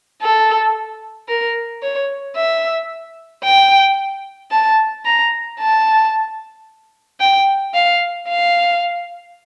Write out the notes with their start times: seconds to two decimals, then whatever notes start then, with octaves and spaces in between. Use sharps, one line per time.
0.22 A4
1.29 A#4
1.82 C#5
2.37 E5
3.44 G5
4.51 A5
5.06 A#5
5.59 A5
7.20 G5
7.74 F5
8.28 F5